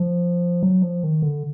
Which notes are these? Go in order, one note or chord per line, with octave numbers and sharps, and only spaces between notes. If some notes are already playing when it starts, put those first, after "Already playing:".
Already playing: F3
F#3
F3
D#3
D3